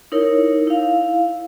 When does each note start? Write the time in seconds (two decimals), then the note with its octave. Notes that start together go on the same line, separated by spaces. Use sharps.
0.12 D#4 E4 A#4 C#5
0.67 E4 F5